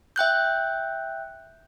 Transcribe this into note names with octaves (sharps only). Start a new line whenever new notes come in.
E5 G5 F#6 G6